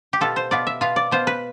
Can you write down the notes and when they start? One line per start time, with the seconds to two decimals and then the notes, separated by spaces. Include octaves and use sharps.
0.13 G4
0.21 B2 B3 F4 A4
0.36 C5
0.51 B2 B3 F4 D5
0.67 E5
0.81 B2 B3 F4 F5
0.96 D5
1.11 B2 B3 F4 C5
1.27 B4